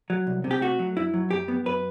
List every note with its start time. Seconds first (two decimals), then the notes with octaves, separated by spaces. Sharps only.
0.10 F#3
0.27 C2
0.44 C3
0.51 G4
0.61 A3 F#4
0.79 F#3
0.96 F#2 E4
1.14 F#3
1.30 F#2 G4
1.48 B3
1.66 F#2 B4